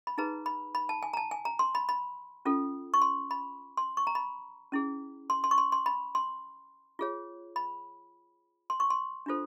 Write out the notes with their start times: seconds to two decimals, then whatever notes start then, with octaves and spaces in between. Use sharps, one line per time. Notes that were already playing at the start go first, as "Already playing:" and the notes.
0.07 B5
0.18 D#4 G#4 B4 A#5
0.46 B5
0.75 B5
0.89 A5
1.03 G#5
1.14 A#5
1.17 A5
1.31 G#5
1.45 A#5
1.59 C6
1.75 B5
1.89 B5
2.45 C#4 F4 A4
2.94 C#6
3.02 C6
3.31 B5
3.77 C6
3.97 C#6
4.07 A#5
4.15 B5
4.72 C#4 E4 G#4
5.30 C6
5.44 C6
5.51 C#6
5.58 C6
5.72 C6
5.86 B5
6.15 C6
6.99 F4 G#4 C#5
7.56 B5
8.70 C6
8.80 C#6
8.90 C6
9.26 D4 F4 A4 C5